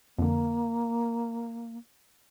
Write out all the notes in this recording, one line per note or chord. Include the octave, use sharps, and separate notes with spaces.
F2 D3 A#3